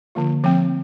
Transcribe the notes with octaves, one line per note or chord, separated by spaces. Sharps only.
D3 F3 A#3 F4
F3 A3 C4